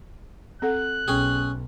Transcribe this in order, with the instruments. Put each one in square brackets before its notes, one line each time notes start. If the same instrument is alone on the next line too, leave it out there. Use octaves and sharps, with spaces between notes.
[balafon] C4 A4 F#5 [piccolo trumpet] F#6
[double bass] B1 [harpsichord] C#4 G#4 [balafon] G5